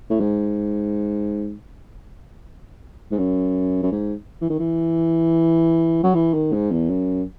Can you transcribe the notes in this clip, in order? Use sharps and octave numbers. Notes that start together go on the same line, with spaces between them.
A2
G#2
G#2
F#2
F#2
G#2
E3
D#3
E3
F#3
E3
D#3
G#2
E2
F#2